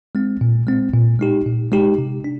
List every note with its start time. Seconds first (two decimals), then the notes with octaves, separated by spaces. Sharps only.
0.15 G#3 C4
0.41 A#2
0.67 G#3 C4
0.94 A#2
1.19 G#3 D#4 G4
1.46 A#2
1.72 G#3 D#4 G4
1.98 C3
2.24 D4